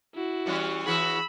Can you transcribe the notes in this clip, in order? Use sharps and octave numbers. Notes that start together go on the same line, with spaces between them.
E4 F#4
E3 G3 C#4
E3 F#4 G#4 B5 E6